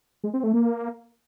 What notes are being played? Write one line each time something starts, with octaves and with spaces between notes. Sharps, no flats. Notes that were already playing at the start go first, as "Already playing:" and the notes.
G#3
C4
A3
A#3